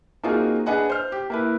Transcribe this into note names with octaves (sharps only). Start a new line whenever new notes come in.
A#3 C4 D#4 F4 F#4 G#4
D4 G#4 B4 D#5 F#5 G#5
C5 F6
G4
A#3 E4 B4